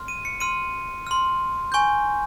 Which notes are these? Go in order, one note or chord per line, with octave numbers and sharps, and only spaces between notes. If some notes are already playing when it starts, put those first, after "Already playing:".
Already playing: C6 F6
D#7
C#7
C6 F6 D#7
C6 F6
G#5 C#6 G6